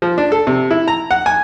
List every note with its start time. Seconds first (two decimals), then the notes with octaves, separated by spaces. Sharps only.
0.02 F3
0.18 D4
0.32 A4
0.47 C3
0.71 E4
0.88 A#5
1.11 F#5
1.26 G#5